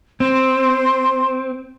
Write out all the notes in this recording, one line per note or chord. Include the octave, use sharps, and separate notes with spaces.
C4 C6